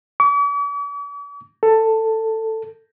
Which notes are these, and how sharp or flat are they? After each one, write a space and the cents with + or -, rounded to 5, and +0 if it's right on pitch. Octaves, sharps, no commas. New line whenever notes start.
D6 -45
A4 +15